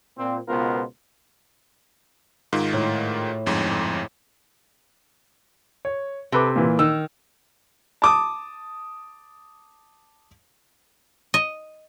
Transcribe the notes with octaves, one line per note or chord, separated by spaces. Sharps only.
A#2 C4
C#2 B2 B3 F4 A#4 C5
G#2 D#3 F4
A2
G1 F2 G#2
C#5
C3 A4 B4 D6
A#2 E3
D#3 E6
A5 D6 D#6
D#5